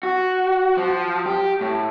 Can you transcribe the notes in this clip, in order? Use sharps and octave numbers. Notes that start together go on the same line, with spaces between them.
F#4
F3
G4
A2